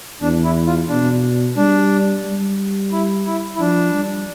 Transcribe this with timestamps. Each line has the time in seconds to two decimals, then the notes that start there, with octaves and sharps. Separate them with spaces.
0.22 E2 D4
0.44 E4
0.67 F4
0.89 B2 D4
1.56 G3 D4
2.25 G3
2.92 E4
3.26 E4
3.56 E4
3.60 F3 D4
3.94 G3